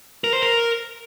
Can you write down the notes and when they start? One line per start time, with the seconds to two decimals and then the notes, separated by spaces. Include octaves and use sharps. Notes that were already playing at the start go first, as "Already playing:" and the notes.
0.24 A#4
0.33 C5
0.42 A#4